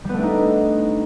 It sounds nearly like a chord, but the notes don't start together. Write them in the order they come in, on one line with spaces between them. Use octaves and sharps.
G3 B3 A3 D4 D#4